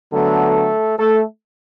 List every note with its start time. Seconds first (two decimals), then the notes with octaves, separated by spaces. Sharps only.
0.12 D3 F#3 A3 B3 A4
0.97 A3 A4